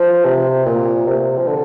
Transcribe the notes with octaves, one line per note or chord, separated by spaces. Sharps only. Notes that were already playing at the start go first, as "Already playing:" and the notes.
Already playing: F3
C3
A#2
C3
F3
D3